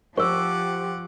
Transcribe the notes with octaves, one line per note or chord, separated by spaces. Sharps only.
F3 G4 C5 F#5 C#6 D6 E6